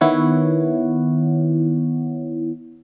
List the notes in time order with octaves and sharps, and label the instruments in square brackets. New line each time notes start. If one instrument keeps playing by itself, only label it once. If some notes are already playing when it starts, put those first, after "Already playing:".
[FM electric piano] D#3 B3 E4 C#5 F#5